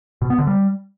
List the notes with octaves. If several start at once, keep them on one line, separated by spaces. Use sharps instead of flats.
B2
B3
D3
G3